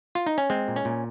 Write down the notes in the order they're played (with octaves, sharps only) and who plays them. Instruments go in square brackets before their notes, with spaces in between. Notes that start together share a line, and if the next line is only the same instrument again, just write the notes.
[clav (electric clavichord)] F4
D#4
C#4
G#3 C4
A#2
C#4
A#2